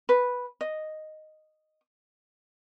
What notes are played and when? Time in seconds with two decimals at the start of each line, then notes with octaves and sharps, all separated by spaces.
0.09 B4
0.61 D#5